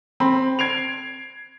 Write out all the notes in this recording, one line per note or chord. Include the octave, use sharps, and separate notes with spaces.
C4 B5
G#6 C7 D7 F7